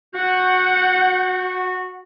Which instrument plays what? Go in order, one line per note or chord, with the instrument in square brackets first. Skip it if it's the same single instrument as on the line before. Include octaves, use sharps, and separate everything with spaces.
[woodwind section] F#4 [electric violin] F#5 G6